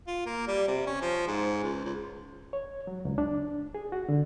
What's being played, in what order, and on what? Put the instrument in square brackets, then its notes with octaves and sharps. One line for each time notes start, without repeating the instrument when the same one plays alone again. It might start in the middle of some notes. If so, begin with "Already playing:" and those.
[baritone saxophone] F4
A#3
G3
C3
C#4
F3
G#2
C#2
C#2
[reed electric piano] C#5
F#3
C#2
D4
G#4
F#4
D3